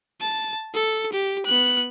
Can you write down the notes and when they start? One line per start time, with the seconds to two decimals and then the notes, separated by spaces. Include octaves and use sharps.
0.21 A5
0.74 A4
1.12 G4
1.45 B3 F#6